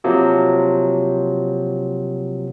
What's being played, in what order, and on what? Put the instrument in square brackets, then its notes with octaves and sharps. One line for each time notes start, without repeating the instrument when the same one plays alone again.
[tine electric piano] C3 F3 F#3 A#3